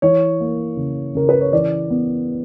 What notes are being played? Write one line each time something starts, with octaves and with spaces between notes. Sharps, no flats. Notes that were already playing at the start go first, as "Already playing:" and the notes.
E3 C#5
A#3
C#3
C#3 A#4
B4
C#5
E3 D5
B3